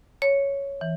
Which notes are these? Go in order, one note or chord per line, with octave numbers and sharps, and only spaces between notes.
C#5
E3